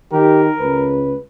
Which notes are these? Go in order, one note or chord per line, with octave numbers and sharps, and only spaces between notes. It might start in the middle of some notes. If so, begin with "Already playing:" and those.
D#3 G4 A#4
C#2 B4